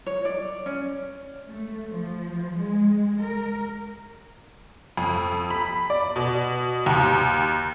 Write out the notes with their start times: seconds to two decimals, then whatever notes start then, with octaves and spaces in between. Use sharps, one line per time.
0.06 C#5
0.25 D5
0.66 C#4
1.51 A3
1.90 F3
2.57 G#3
3.19 A#4
4.97 F2
5.50 B5
5.90 D5
6.16 B2
6.86 D#2